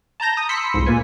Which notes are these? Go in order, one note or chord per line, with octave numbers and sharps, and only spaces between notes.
A5 A#5 G6 A#6
D#6
B5 C6 E6 B6 C#7
C2 F2 G#2
A#2 A#3 F4 B4 G#5